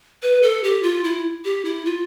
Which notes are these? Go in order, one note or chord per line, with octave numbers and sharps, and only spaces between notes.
B4
A4
G4
F4
E4
G4
E4
F4